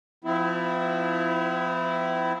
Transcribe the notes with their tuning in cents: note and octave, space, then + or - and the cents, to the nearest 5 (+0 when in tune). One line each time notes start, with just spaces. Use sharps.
F3 +0 C4 -40 E4 +0